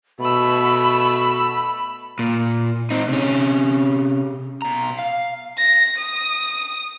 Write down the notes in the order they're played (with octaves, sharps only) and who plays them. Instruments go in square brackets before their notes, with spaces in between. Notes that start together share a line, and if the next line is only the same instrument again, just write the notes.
[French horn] B2 [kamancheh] A3 E6 [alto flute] B5
[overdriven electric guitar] A#2
C4 D#4
C3 C#4
B2 A#5
F5
[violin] A#6
D#6